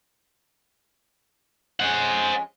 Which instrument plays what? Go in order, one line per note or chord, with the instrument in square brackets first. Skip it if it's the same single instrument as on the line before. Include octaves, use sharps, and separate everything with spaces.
[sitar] F2 G#3 C#4 [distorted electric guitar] C5 F#5